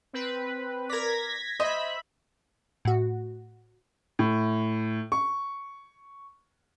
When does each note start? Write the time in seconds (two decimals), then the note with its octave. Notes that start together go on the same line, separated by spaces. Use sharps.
0.13 C4 B4
0.90 A#4 D5 G#6 A#6 B6
1.60 C5 D#5 E5 B5
2.85 A2 F#4
4.19 A2
5.12 C#6